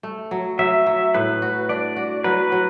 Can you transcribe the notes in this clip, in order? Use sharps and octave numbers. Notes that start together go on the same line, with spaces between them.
A3
F#3
F#3 E5
F#3
A2 B4
F#4
D4 D5
F#4
F#3 B4
F#3